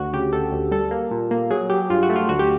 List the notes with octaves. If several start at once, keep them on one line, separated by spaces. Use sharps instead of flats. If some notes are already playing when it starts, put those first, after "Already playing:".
Already playing: D2 F#4
C#3 G4
D2 A4
D2
G3 A4
A#3
A#2
A#3
F#3 G#4
F#3 G4
G2 F4
F#4
A3
F4
D2 F#4
G4